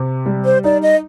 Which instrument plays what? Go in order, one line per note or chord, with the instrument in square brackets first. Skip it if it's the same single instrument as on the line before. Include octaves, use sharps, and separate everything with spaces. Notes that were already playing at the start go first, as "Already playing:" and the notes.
Already playing: [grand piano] C3
G3
[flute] C5
[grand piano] D#4 [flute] D5
[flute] D#5